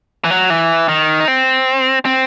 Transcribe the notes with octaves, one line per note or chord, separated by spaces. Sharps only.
E3
F#3
E3
D#3
D#4
C4
C4